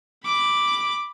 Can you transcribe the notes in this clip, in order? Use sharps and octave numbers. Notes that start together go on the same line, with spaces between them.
B5 D6